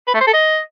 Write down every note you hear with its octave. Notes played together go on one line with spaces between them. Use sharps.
B4
A3
C5
A4
D#5